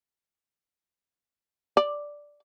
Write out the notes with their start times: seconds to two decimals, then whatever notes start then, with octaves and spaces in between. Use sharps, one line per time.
1.77 D5